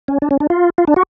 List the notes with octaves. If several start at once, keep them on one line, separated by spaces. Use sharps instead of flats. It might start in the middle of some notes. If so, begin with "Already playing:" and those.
C#4
D4
C#4
D4
F4
F4
D4
F#4